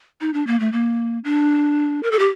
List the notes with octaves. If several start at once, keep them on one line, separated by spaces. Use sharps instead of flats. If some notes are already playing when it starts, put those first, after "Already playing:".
D#4
D4
A#3
A3
A#3
D4
A#4
A4
G4